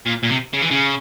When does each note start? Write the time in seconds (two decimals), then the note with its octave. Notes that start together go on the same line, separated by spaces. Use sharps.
0.06 A#2
0.23 A#2
0.30 C3
0.54 C#3
0.62 E3
0.71 C#3